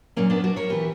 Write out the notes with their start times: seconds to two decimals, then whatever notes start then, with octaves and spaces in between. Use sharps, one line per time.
0.16 A#2 F#3 A#3 C#4
0.30 B3 D4
0.44 D4 F#4
0.56 A#4 C#5
0.70 E3 G4 B4